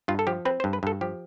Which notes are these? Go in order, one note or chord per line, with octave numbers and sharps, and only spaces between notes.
G2 F4
A4
F3 G4
C4 B4
C5
G2
B4
G2 A4
F3 G4